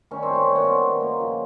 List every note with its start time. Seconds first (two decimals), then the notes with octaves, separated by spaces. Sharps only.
0.11 D#3 G3 C#4
0.23 C4
0.29 F#2
0.35 C#4
0.46 D#3 G3
0.56 B3
0.64 F#2 C4
0.82 D#3 G3 B3
1.00 F#2 A#3
1.18 C#3 F3